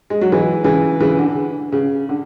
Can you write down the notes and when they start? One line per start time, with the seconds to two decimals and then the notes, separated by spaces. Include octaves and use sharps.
0.10 G#3
0.21 F#3
0.32 E3 G#3
0.64 C#3 E3
1.00 C#3 E3
1.19 D3
1.72 C#3
2.09 D3